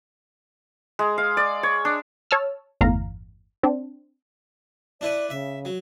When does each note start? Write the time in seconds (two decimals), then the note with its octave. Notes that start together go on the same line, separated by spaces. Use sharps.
0.99 G#3
1.18 F5
1.37 D5
1.63 C#5
1.85 D4
2.31 C#5 A5 E6 F6
2.81 G1 E2 A2 F5 A#5
3.63 C4 D4
5.01 D4 E4 B4 D5
5.30 C#3 E5
5.65 F#3